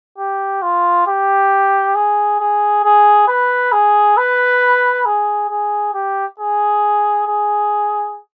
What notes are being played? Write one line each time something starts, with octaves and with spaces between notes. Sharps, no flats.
G4
F4
G4
G#4
G#4
G#4
B4
G#4
B4
G#4
G#4
G4
G#4
G#4